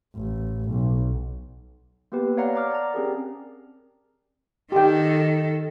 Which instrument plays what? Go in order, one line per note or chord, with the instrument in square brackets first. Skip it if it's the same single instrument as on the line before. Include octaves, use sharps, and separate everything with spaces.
[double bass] A1
B1
[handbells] A#3 B3 G4 B4
C#5 D5 F5 F#5 A#5
D5 A#5 D6 F6
D5 A5 A#5
C4 C#4 G4 G#4 A#4
[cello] D#3 A4 [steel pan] G4 G5